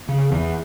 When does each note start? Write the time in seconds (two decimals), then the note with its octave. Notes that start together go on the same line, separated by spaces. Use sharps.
0.09 C#3
0.32 E2